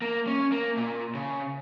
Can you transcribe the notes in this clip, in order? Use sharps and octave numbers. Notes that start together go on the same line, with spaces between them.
A#3
C#4
A#3
A#2
C#3